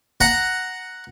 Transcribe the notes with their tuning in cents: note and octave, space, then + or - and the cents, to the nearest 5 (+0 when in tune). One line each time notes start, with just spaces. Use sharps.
F#5 +0 A#5 +0